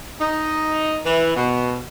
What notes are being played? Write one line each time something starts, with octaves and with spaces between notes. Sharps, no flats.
D#4
E3
B2